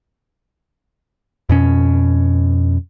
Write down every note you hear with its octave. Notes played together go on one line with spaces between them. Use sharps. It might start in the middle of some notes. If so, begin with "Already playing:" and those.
F2 B2 C#4